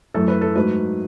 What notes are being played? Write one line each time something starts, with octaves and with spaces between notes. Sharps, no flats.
F#2 E3 A3 A4
B4
A4
G#2 F#3 A3 B4